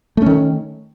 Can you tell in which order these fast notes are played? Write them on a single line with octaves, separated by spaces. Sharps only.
A3 C#4 D#3